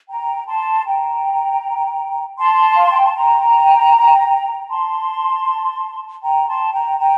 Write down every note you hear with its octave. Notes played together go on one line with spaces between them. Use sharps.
G5 A#5
A5 C6
G5 A#5
A5 C6
F5
G5
A5
G5 A#5
A5 C6
G5 A#5
A5 C6
G5 A#5
G5 A#5